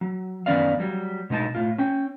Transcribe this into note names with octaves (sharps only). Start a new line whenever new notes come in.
F#3
F#2 D#3 B3 C#4 D5 F5
F#3 G3
B2 G#3 D#4 A5
A2 F4
C#4 G5